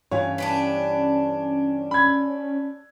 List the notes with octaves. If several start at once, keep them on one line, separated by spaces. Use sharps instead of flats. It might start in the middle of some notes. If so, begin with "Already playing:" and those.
G2 E3 C#4 C#5 F5
D4 G4 B4
B5 G#6